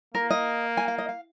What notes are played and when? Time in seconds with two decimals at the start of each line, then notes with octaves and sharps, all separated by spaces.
0.14 A#3 A#4
0.30 D#5
0.77 G#5
0.88 F5
0.98 D#5
1.09 F5